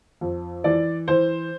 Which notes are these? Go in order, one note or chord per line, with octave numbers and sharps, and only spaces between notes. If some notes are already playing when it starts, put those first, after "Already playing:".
F2
E3 D5
E3 C5